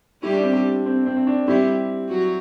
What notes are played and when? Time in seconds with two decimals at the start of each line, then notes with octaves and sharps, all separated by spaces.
0.23 G3 E4 G4
0.33 D4
0.43 C4
0.53 D4
0.86 C4
1.06 C4
1.16 C4
1.27 D4
1.47 G3 C4 E4 G4
2.09 F#3 F#4